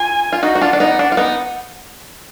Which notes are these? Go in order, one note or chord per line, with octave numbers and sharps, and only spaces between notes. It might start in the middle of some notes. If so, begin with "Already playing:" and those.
Already playing: F4 G#5
F4
D#4 F#4 F#5
F#4
D4 F4
D4
B3 D#4
D4
F4
B3 D#4